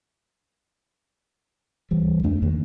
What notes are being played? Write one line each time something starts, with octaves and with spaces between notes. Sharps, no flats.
D2 E3 G3
F2 A3 D4
E2 D3 D#3 A#3